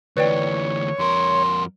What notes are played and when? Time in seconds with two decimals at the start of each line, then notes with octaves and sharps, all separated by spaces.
0.17 D2 E3 B4 C#5 D5 G5
0.99 F2 A#4 C6